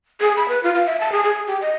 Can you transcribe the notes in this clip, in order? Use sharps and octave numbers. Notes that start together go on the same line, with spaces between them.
G#4
B5
B4
F4
F5
E5
A5
G#4
G#4
G4
D#5